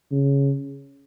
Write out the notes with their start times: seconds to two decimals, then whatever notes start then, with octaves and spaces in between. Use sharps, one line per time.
0.11 C#3